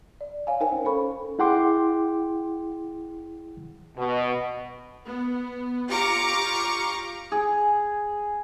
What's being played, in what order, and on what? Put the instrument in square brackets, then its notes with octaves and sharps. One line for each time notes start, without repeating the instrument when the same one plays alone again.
[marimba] D5
C#5 F5 G#5
D#4 A#4 C5 F5 G5 G#5
C#4
C#4 A4 C5 B5 C#6
[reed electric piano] E4 G#4 F#5 G5 C6 D6
[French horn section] B2
[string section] B3
F4 G4 A#5 C#6 D6
[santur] G#4